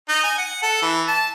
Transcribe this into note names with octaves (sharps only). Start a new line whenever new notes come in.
D#4
G#5
F#5
A4
E3
A5